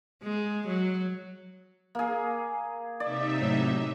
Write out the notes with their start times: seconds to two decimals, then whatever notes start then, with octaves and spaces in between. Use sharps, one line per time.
0.23 G#3
0.68 F#3
1.95 A#3 G#4
3.00 C3 D#4 D5 E5
3.40 A2 F#3